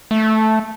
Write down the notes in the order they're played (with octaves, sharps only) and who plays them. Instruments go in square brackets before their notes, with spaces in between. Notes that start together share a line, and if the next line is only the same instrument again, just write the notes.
[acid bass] A3